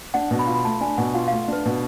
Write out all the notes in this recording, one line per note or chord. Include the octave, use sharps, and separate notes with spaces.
D4 F#5
B2
B5
F4
B5
A3 A5
D4 G#5
B2 F#5
F4 F#5
F5
A3
D4 B4
B2